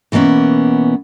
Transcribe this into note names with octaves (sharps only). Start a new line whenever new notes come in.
B2 E3 A#3 B3 C#4